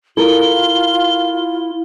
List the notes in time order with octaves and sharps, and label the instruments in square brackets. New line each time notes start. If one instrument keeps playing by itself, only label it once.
[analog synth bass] E4 [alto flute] F4 [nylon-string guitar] A4 A#4 [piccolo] G7